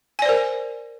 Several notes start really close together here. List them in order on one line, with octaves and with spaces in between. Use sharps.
G#5 D5 C5 A#4